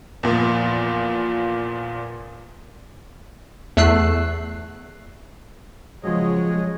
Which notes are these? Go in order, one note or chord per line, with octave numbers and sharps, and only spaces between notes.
E2 A#2 F3
E2 A3 E6 F#6 C7
C#3 F3 F#3 G#3 G#4 C#5 D#5